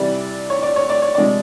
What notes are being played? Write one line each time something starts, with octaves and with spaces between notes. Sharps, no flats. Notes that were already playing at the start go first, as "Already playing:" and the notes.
Already playing: C3 E3 G3 D5
C#5
D5
C#5
D5
C#5
C3 F3 G#3 D5